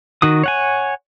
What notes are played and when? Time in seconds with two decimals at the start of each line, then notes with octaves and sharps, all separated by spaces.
0.22 D#3 F#4 D#6
0.44 C#5 F#5 G#5